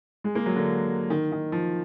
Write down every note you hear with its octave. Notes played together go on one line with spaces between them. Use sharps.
G#3
A#3
F#3
D3
D#3
D#3
F3